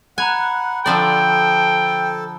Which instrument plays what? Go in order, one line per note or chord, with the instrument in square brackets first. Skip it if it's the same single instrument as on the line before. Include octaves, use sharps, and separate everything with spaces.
[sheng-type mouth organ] F#5 [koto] G#5 [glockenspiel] A#5 B5 F#6
[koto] D3 F3 D5 [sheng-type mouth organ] A4 [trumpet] G5